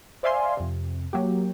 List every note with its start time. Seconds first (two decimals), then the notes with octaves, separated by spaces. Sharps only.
0.23 C5 D5 E5 F5 G#5 C6
0.57 F2 C3
1.13 F#3 A#3 G4